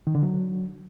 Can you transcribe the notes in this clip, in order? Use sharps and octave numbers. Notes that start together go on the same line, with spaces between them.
D#3
D3
F#3